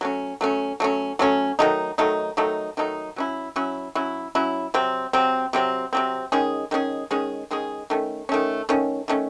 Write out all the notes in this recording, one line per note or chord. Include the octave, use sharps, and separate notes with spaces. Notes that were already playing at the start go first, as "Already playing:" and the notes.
F#3 A3 C#4
F#3 A3 C#4
F#3 A3 C#4
F#3 A3 C#4
D#3 F#3 A3 D#4
D#3 F#3 A3 D#4
D#3 F#3 A3 D#4
D#3 F#3 A3 D#4
F#3 C#4 E4
F#3 C#4 E4
F#3 C#4 E4
F#3 C#4 E4
C3 F#3 C4
C3 F#3 C4
C3 F#3 C4
C3 F#3 C4
D#3 G#3 C#4 G#4
D#3 G#3 C#4 G#4
D#3 G#3 C#4 G#4
D#3 G#3 C#4 G#4
D#3 A3 C#4
D#3 A3 C#4
D#3 A3 C#4
D#3 A3 C#4